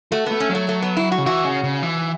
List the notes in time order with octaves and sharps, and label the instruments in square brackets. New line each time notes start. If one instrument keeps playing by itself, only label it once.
[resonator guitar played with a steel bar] A3 [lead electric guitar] F#4
[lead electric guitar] A3 [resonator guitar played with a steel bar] B3
[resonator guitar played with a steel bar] C#4
[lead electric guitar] F#3
[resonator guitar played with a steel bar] A3
A3
B3
E4
F#4
[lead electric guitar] C#3
[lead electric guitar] E3 [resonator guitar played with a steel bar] F#4
[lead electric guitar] C#3
C#3
E3